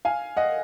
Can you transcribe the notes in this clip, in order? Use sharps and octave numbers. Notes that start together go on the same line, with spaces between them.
F5 G#5
D#5 F#5